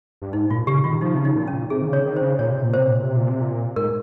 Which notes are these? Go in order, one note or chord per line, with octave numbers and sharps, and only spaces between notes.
G2
G#2 D#4
A#2 F4
C#3 G4
D#3 F4
F3 D#4
C3
C#3
D#4
A#2
C#4
A#2
C3 G#4
D#3
C#3
C#5
D#3
C5
C#3
A#2 C#5
C3
A#2
C3 C5
A#2
C3
A#2
C3
A#2
G#2 A#4